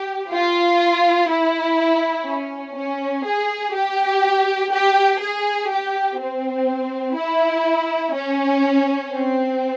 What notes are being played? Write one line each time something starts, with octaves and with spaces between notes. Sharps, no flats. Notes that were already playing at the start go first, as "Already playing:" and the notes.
Already playing: G4
F4
E4
C#4
C#4
G#4
G4
G4
G#4
G4
C4
E4
C#4
C4